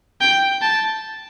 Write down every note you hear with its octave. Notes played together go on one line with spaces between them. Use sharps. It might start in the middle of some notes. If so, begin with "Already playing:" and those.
G5
A5